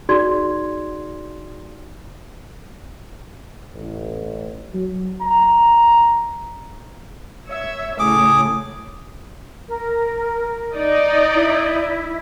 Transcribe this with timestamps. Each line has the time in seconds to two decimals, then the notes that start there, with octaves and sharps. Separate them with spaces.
0.09 D#4 F#4 G#4 D5 C6 G#6
3.74 A1
4.74 F#3
5.21 A#5
7.47 C#5 E5
8.00 A2 C#3 G#4 D6
9.68 A#4
10.75 D#4 D5 D#5
11.34 E4